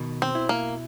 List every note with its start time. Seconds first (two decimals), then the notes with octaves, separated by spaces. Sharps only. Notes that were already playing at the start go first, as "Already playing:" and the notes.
Already playing: B2 D#3
0.22 C4
0.35 E4
0.49 A#3